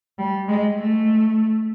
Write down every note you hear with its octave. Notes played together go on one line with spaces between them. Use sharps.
G3
G#3
A3